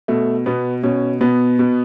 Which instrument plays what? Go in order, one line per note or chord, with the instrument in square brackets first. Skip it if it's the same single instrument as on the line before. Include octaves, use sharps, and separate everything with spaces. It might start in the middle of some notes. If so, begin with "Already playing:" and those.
[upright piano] B2 A3
B2 B3
B2 C#4
B2 B3
B2